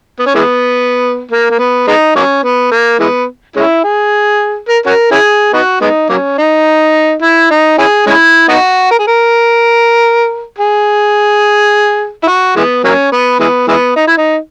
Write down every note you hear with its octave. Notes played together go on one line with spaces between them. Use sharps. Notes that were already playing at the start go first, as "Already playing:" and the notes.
B3
C#4
E3 G#3 B3
A#3
A#3
B3
G#3 B3 D#4
F#3 A#3 C#4
B3
A#3
E3 G#3 B3
G#3 C#4 E4
G#4
A#4
C#4 F#4 A#4
C#4 E4 G#4
B3 D#4 F#4
G#3 B3 D#4
F#3 A#3 C#4
D#4
E4
D#4
C#4 E4 G#4
G#3 C#4 E4
B3 D#4 F#4
A#4
G#4
A#4
G#4
E4
F#4
E3 G#3 B3
F#3 A#3 C#4
B3
E3 G#3 B3
E3 G#3 B3
D#4
E4
D#4